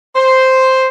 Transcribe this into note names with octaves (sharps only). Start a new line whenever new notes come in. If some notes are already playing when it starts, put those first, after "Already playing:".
C5